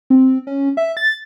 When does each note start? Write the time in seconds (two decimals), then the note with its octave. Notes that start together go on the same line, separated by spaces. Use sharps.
0.10 C4
0.47 C#4
0.77 E5
0.97 A6